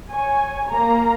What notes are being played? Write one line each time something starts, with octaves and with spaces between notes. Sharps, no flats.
C#5 G#5
A#3 A#5